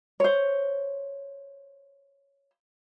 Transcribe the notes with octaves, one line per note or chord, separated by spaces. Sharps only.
C5 C#5